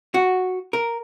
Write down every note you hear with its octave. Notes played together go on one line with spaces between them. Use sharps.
F#4
A#4